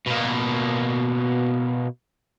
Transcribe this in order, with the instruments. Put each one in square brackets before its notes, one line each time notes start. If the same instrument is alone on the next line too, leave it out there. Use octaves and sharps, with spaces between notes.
[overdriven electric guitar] B2 A#3